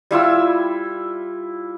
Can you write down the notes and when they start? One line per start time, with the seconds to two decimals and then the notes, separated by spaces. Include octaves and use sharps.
0.11 G3 E4 F4 E6